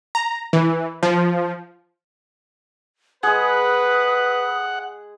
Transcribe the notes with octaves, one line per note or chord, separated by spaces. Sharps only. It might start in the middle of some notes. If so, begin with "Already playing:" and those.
A#5
E3
F3
G#3 G#4 B4 F#5 D#6